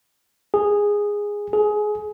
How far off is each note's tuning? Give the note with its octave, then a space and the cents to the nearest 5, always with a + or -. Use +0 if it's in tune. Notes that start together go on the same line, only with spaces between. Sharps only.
G#4 -10
G#4 +20